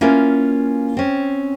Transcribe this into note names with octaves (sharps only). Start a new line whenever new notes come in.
A#3 C#4 E4 F4 A#4 B4
C4 C#4